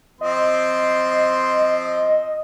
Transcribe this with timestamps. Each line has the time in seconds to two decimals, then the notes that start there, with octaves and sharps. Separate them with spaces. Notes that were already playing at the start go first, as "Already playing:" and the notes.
0.21 F3 C4 D#5 C6